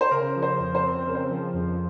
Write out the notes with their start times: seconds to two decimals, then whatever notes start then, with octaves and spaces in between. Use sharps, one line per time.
0.01 C5
0.11 C#3 A#4
0.35 F3
0.43 C5
0.59 F2
0.75 C5
0.83 C4
1.06 C#3 A#4
1.15 C5
1.25 F3 A#4
1.54 F2